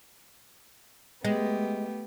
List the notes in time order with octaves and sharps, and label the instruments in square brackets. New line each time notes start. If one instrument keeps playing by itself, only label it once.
[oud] G#3 [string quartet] A3 B3 G4